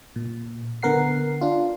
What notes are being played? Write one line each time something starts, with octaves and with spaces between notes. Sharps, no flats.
A#2
D3 B3 A#4 F#5 C7
D4 F4